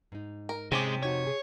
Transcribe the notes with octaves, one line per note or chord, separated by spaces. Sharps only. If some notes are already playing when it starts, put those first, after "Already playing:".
G#2 D#4
A#4
C3 G#3 C4 C#4 G4
F2 D#4 F#4 C#5
G#4